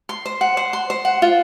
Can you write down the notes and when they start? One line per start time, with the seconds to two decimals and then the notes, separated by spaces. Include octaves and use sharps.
0.09 C6
0.26 C5
0.41 F#5
0.57 C5
0.73 C6
0.90 C5
1.05 F#5
1.22 F4